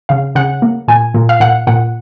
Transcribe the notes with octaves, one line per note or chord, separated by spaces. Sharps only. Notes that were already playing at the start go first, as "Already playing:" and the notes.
C#3 F5
C#3 F#5
A#3
A#2 G#5
A#2
F5
A#2 F#5
A#2 F#5